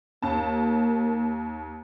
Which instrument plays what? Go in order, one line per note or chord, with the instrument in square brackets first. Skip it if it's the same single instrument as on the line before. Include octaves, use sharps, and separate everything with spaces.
[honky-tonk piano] D#2 A5 [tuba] A#3